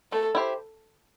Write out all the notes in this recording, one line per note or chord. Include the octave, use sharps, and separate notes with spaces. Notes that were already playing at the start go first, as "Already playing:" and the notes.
A3 A4
E4 G4 C5